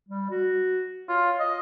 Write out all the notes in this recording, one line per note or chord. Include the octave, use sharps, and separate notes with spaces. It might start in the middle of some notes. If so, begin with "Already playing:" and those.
G3
F#4
F4 C#5
D#5